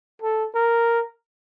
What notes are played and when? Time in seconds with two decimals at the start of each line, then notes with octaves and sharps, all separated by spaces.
0.22 A4
0.55 A#4